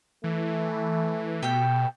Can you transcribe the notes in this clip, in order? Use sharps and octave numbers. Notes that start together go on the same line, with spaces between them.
E3 A3
B2 G4 A4 G5